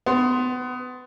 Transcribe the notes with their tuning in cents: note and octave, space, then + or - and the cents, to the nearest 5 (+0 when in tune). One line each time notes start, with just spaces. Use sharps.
B3 +25 C6 +0